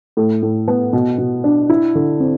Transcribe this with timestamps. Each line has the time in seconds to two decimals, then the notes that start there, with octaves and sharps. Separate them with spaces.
0.17 A2
0.43 A2
0.68 B3
0.93 B2
1.18 B2
1.44 D4
1.69 E4
1.95 D3
2.20 C4